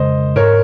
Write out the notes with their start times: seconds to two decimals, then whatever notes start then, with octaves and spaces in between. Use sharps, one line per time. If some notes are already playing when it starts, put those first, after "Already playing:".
Already playing: F2 C#3 G#3 C5 D#5
0.36 G#2 A#4 C#5